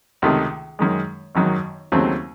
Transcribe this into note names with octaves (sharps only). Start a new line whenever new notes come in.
C#2 C3 D#3 A3
F#2 D#3 G#3
G#1 F#2 D#3 F#3
D#2 C#3 F#3 A3 C4